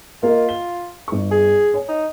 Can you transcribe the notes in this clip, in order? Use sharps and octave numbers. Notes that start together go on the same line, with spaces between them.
A#3 F4 A#4 D#5
G7
G1 C#6
G#4
C#5 G#5
D#4